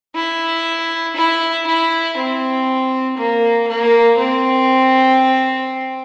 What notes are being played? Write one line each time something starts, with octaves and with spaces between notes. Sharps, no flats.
E4
E4
E4
C4
A#3
A#3
C4